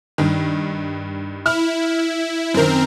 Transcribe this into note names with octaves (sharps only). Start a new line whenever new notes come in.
G2 D#3
E4 F6
F#2 D#3 C4 A#4